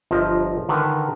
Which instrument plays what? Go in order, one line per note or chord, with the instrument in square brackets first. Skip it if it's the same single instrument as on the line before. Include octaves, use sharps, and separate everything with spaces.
[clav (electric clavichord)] G1 F3 D#5 E5 A#5
D3 D#3 A#4 B4